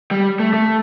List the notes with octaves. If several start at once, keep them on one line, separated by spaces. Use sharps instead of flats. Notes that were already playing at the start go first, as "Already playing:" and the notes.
G3
A3
A3